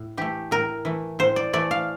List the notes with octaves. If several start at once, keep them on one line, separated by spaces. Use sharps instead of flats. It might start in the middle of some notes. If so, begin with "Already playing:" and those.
Already playing: A2
E3 A3 G4
A2 A#4
E3 A3
A2 C5
D5
E3 A3 D5
F5